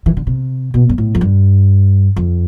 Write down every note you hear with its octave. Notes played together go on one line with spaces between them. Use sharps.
E3
D3
C3
B2
G2
A2
F2
G2
F2